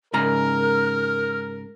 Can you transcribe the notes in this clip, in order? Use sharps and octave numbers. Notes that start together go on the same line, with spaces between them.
G#2 C#3 A#4 A#5 F6